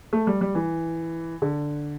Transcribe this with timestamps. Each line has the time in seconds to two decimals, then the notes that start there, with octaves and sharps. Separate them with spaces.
0.13 A3
0.27 G3
0.41 G3
0.55 E3
1.42 D3